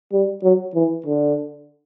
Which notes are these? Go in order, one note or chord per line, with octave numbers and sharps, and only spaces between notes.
G3
F#3
E3
D3